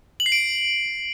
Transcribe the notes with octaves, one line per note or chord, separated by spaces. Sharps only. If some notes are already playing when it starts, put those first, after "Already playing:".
F#7
C7
D7